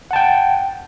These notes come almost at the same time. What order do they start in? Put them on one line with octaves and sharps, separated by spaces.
F#5 A5 G5